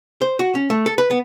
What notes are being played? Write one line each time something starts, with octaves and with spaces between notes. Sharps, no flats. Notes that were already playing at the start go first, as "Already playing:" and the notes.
C5
F#4
C#4
A3
A4
B4
B3